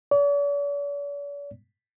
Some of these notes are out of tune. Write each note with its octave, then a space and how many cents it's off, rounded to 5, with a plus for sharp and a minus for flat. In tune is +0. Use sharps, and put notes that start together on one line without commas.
D5 -45